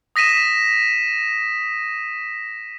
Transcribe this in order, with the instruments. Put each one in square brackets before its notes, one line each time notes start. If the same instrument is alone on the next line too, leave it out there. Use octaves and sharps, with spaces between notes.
[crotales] D#6 A#6 B6 D#7 E7